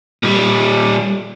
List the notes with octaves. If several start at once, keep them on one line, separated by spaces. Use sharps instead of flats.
A#2 G3